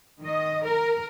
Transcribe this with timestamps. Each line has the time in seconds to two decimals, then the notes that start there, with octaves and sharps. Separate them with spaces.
0.22 D#3 D#5
0.66 A#4